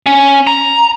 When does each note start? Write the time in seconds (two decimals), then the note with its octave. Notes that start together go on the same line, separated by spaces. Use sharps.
0.06 C#4
0.47 A#5